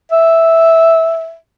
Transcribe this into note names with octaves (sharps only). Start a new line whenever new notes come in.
E5